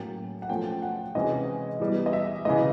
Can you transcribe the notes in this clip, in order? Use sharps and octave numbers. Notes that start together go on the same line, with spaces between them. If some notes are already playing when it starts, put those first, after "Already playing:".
Already playing: A2 F#3 A#3 C#4 G5
F#5
F3 A3 C#4 G5
F#5
C3 E3 G#3 C#4 E4 D#5
E3 G3 B3
D#5
E5
C#3 E3 G#3 D#5